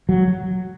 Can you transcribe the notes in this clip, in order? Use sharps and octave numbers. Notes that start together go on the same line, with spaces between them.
F#3